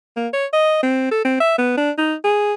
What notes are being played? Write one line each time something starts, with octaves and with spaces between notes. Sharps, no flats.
A#3
C#5
D#5
C4
A4
C4
E5
B3
D4
D#4
G#4